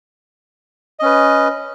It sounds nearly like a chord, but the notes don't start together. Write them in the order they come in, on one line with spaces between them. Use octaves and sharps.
D#5 C#4 B4